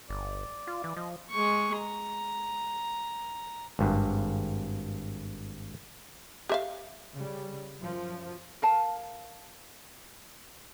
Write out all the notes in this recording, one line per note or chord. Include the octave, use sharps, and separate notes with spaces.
G1 D5
F4
E3
F3 D#5
G#3 C#6
A#5
G#1 G2
G4 E5 F5
C#3 G3
F#2 F3
A#4 F5 A5